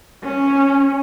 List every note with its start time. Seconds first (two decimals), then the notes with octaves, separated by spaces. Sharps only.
0.24 C#4